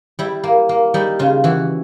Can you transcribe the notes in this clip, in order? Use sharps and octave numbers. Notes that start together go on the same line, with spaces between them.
G3 E4
A#3
A#3
G3 D#4
C#3 F4
E3 F#4